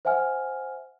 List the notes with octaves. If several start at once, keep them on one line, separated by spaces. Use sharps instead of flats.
C5 E5 F#5 G#5 F6